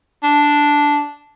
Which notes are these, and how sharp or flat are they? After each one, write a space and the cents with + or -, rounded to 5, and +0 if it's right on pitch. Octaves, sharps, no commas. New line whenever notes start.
D4 -5